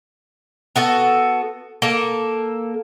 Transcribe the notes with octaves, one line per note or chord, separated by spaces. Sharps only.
B3 F#4 A4
A#3 A4